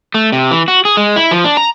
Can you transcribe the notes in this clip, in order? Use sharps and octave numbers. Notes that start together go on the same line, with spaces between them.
A3
C3
E3
F#4
G#4
G#3
E4
F3
D4
A#5